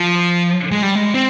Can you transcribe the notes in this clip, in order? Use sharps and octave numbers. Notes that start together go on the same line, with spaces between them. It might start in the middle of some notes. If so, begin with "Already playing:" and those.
Already playing: F3
G#3
G3
G#3
C4